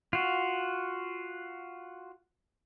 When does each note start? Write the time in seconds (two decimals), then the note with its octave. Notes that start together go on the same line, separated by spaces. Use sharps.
0.13 F4 F#4